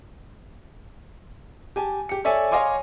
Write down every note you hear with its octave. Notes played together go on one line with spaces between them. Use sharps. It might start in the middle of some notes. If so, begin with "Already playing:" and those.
G4 G#5 A5
G4 C#7
A4 C#5 D5 E5 G#5
C#5 D#5 F5 G#5 C6 D6